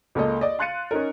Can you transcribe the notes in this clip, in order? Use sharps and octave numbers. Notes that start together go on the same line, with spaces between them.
C#2 A#3 A4 D#5
D5 D#5
F5 C6 F#6 A6 C#7 D#7
C#4 D#4 A#4